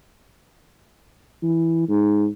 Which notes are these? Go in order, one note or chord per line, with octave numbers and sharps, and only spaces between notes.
E3
G#2